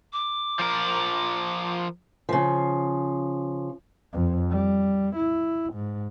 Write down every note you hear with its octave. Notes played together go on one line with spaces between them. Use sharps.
D6
F3 A#4
C#3 F3
F2
G3
E4
G#2